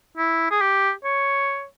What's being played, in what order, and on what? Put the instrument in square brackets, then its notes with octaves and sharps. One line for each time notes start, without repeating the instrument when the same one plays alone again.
[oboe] E4
G#4
G4
C#5